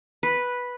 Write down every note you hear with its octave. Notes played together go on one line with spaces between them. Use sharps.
B4